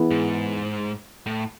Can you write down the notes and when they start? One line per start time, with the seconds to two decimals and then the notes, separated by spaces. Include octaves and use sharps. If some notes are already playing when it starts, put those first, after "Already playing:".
Already playing: E3 B3 E4 G#4
0.11 G#2
1.26 A2